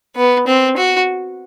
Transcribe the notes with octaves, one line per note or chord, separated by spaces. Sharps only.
B3
C4
F#4